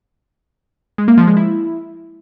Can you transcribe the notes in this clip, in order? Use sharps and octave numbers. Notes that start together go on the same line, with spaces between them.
G#3
A#3
F3
G#3
E4